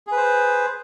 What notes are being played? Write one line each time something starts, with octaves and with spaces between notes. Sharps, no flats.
G#4 B4 C5